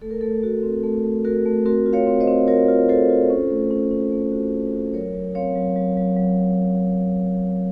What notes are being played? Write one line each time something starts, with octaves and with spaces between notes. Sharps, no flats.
A3 A4
A#4
A3 A4
A3 F#4
C4
A3 A4
A3
A3 F#4 A#4
A3
C4 F#4 A#4
F4
C#5 F5
C4
C5 D#5
C4
F4 A#4 C#5
F4
F4 A4 C5
F4
C#4
A3
C#4
C#4
A3
F#4
F#4
F#4
F#3 A#4 C#5
F#3
C4 C#5 F5
F#3
F#3
F#3
F#3